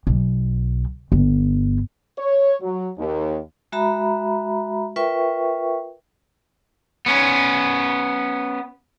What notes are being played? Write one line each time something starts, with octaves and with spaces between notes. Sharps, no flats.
B1
G1
C#5
F#3
D#2
G#3 F#4 E5 A#5 B5
F4 A#4 B4 E5 G5 C#6
B3 C#4